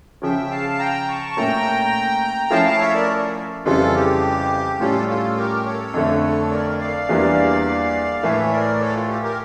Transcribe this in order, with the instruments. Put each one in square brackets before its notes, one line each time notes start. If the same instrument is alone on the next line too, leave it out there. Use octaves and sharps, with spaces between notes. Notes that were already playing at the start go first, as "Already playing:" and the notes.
[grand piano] C#3 F3 C#4 [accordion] E5 G5
[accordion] F5 A5
G5 A#5
A5 C#6
[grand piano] A#2 A3 C#4 [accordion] G5 A#5
[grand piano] F3 A3 C#4 E4 A4 [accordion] F5 A5
[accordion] F5 A5
C#5 E5
A#4 D5
[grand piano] F2 C#3 E3 G3 [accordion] F4 A4
[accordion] G4
[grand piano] A2 G3 C#4 [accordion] F4 A4
[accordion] F4 A4
G4 A#4
A4 C#5
[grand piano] F2 D3 A3
[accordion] A#4 D5
D5 F5
[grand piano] E2 E3 G3 A#3 D4
[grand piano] A2 E3 A3 E4 [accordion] C#5 E5
[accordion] A#4 D5
A4 C#5
F4
G4
G4 A#4